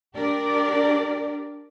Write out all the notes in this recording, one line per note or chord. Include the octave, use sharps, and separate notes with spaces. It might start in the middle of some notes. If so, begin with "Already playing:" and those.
D4 G4 A#4 D5